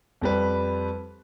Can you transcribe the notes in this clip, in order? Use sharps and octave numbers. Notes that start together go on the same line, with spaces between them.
F2 G3 B4